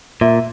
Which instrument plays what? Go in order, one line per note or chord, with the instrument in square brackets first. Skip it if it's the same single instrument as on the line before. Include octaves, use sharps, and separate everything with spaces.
[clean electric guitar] A#2 [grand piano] E5